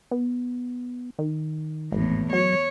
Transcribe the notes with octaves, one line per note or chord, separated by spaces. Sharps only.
B3
D#3
G#1 E2 A2
F#3 C#5